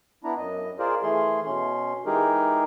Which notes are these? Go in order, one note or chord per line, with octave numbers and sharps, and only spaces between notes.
B3 D4 E4 A#5
F#2 D#5
F4 G#4 A#4 C5 D5
E3 A3 G#4 C6
B2 C#4 C6
E3 G#3 D#4 G4 G#4 A#4